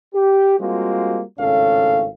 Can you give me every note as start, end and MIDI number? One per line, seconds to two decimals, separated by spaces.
0.15 0.56 67
0.59 1.22 55
0.59 1.22 56
0.59 1.22 58
0.59 1.22 60
0.59 1.22 65
0.59 1.22 66
1.39 2.07 32
1.39 2.07 45
1.39 2.07 49
1.39 2.07 61
1.39 2.07 69
1.39 2.07 77